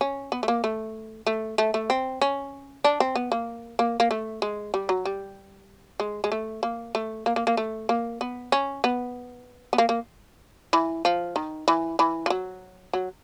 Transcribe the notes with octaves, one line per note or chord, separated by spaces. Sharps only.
C#4
B3
A3
A#3
A3
A3
A3
A3
C4
C#4
D4
C4
B3
A#3
A#3
A#3
A3
G#3
G3
F#3
G3
G#3
G#3
A3
A#3
A3
A#3
A#3
A#3
A3
A#3
B3
C#4
B3
B3
A#3
A#3
E3
F3
D#3
E3
E3
F3
F#3
F#3